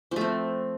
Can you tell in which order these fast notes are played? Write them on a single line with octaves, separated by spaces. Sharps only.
F3 A3 C4